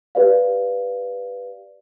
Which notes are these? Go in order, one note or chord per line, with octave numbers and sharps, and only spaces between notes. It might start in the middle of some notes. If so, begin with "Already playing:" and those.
G4 B4 D5 F5